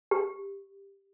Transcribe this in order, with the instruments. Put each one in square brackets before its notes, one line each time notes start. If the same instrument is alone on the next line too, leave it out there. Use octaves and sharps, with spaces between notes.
[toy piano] G4